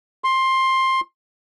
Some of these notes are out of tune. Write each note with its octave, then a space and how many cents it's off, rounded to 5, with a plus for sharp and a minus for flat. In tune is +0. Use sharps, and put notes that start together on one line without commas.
C6 +15